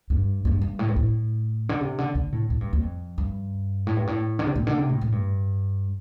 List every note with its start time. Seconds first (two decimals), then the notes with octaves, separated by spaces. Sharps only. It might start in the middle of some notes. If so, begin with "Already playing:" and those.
0.10 G2
0.45 G2
0.62 G2
0.79 A2
0.88 G2
0.96 A2
1.69 D3
1.81 C3
1.98 D3
2.15 D3
2.32 A2
2.50 A2
2.61 G2
2.73 F2
3.18 G2
3.87 A2
3.97 G2
4.07 A2
4.39 D3
4.46 C3
4.56 A2
4.67 D3
4.78 C3
4.89 A2
5.01 A2
5.12 G2